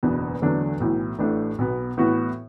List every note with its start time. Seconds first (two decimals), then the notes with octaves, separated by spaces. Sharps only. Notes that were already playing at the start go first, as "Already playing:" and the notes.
0.03 F#1 E2 B2 B3 D4
0.42 E2 D3 F#3 A3 D4
0.80 B1 A2 E3
1.19 A1 A2 A3 D4
1.58 B1 B2 B3
1.97 A2 E3 B3 F#4